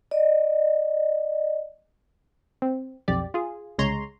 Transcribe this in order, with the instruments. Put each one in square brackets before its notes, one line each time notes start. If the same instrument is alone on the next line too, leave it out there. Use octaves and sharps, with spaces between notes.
[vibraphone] D5 D#5
[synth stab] C4
B1 F2 G4 D5
F4 G#4
C2 C#3 G#3 C#5 A#5 C6